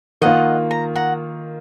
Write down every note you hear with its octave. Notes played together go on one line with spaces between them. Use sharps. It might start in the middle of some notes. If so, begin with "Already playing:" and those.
D#3 A#3 F4 D#5 F#5
A#5
F#5 A#5